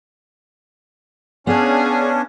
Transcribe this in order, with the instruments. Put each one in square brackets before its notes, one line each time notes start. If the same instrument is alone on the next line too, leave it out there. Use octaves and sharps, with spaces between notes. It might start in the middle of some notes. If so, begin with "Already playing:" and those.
[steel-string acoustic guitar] B3 F5 [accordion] C#4 D4 [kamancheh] G#4